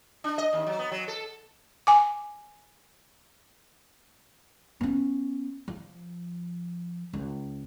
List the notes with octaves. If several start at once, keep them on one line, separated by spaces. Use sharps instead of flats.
D4
D#5
D#2
F#3
B3
F#3
A4
G#5 D6
B3 C#4
F3
C#2